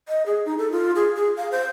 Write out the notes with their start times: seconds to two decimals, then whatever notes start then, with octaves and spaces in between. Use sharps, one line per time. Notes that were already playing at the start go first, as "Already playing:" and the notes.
0.08 D#5
0.26 G#4
0.46 D#4
0.58 A4
0.72 F4
0.96 G#4
1.16 G#4
1.37 F5
1.52 C5